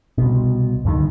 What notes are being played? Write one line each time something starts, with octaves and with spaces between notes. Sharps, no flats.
C2 B2
D2 G2 D3 D#3